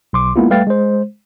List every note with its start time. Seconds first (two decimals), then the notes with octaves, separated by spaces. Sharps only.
0.13 B1 C6 D6
0.36 G#3 A#3 B3 E4 F4
0.50 G3 A3 B4 F5 G5 A6
0.67 G#3 C5